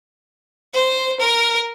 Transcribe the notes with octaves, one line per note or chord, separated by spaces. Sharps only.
C5
A#4